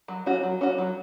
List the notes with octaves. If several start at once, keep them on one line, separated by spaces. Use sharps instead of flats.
F#3
C#4 F#4
F#3
C#4 F#4
F#3